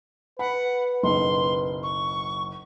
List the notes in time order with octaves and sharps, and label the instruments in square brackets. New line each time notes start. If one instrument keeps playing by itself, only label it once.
[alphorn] B4 [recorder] F#5 [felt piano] B5
[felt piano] F#1 B1 [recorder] C6
[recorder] C#6